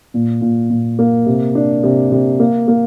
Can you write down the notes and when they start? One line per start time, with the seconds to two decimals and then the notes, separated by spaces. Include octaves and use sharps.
0.14 A#2
0.41 A#2
0.70 A#2
0.99 A#3
1.26 C3
1.55 D4
1.83 C3
2.12 C3
2.40 A#3
2.68 A#3